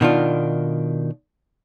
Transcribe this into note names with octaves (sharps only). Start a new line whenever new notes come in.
B2 D#3 D4 F4